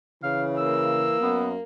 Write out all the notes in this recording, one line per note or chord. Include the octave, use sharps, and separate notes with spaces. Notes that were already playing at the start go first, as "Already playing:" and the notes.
C#3 E3 F5
A#3 E6
F#2 B3